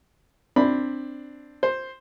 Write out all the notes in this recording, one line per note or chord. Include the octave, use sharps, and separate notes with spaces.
C4 D4 B5
C5